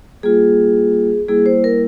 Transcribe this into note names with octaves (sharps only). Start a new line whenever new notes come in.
G3 A#3 F4 G#4
G3 A#3 E4 G#4
C5
A#4